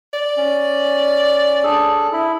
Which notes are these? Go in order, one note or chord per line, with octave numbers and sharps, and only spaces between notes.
D5
C#4
D4 G#4 A4
E4